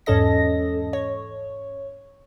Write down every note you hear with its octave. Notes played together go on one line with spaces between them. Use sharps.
E2 G#2 C#4 A4 D#5 A#6
C#5